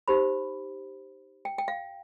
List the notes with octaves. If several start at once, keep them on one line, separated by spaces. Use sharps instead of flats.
D#4 G4 C5 B5
G5
G5
F5